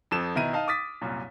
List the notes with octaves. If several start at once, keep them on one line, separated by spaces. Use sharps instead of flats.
F2 F3 A4 E7
B2 D#3 E4 A#5 D#7
D#4 F5 A5
D6 D#6 A6 B6
C2 F#2 A#2